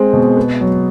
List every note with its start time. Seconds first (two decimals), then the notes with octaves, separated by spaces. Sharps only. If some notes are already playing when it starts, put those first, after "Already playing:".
Already playing: G#3 C4
0.13 B2
0.37 B3
0.60 F#3